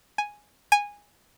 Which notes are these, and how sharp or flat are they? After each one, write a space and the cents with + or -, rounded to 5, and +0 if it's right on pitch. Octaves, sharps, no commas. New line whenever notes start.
G#5 +0
G#5 -15